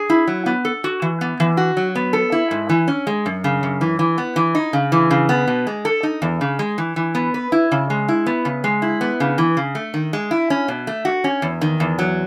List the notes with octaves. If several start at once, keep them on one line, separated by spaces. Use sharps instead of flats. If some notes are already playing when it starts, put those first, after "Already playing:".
Already playing: G#4
E4
F#3
B3
A4
F#4
E3
B3
E3
F#4
F#3
B3
A4
E4
G#2
E3
C#4
G#3
F#2
C#3
F#2
E3
E3
B3
E3
D#4
C#3
E3
C#3
B3
B2
G#3
A4
D#4
E2
C#3
G#3
E3
E3
B3
B4
E4
C#3
G#3
E4
B3
C#3
G#3
E4
B3
C#3
E3
C#3
A3
D#3
G#3
E4
C#4
B2
A3
F#4
C#4
E2
D#3
E2
F#3